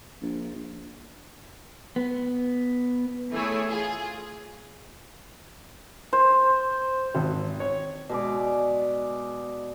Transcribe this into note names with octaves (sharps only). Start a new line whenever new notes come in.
A#1
B3
E3 A3 E4 G#4 C#5
F4 G#4
C5
G#1
C#5
B2 G#3 D5